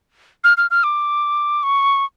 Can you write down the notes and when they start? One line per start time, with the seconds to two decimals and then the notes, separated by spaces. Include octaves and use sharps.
0.44 F6
0.57 F6
0.71 F6
0.84 D6
1.63 C#6